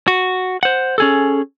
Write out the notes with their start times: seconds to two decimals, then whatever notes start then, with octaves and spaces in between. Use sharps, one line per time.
0.08 F#4
0.63 C5 F#5
0.98 C#4 G#4 A4